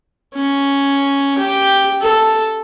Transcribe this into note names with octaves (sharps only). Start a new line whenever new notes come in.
C#4
G4
A4